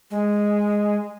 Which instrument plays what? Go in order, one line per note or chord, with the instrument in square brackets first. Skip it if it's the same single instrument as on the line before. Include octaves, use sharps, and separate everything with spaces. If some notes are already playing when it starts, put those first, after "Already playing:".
[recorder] G#3